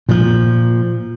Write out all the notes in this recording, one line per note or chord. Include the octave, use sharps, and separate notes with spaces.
A#2 F3